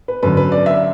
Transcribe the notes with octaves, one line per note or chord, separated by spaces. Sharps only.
B4
F#2 D3 B4
B4
D5
E5